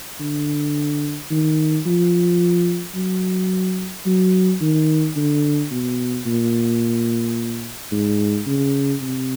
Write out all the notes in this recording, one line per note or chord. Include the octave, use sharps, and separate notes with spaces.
D3
D#3
F3
F#3
F#3
D#3
D3
B2
A#2
G#2
C#3
C3